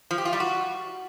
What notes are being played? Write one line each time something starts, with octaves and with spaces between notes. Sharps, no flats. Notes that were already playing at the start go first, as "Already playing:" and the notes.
F3
G4
F4
G3
F#4